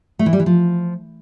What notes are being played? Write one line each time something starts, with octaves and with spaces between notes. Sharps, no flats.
A3
E3
G3
E3
F3